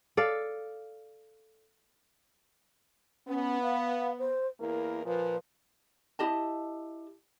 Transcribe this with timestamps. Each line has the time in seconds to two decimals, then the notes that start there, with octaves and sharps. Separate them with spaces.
0.17 A4 D5 F5
3.28 B3 C#4
3.63 F5
4.18 C5
4.60 E2 A#3 E4 A#4
5.05 A#2 F3 B4
6.19 E4 G4 D#5 A5